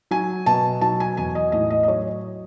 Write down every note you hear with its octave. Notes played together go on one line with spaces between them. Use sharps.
F#3 G#5
B2 A5
F#3 A5
G#5
E2 G#5
D#5
A2 D#5
D#5
D#5
F#3 C#5